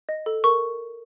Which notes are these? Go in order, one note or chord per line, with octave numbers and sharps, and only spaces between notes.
D#5
A4
A#4 C#6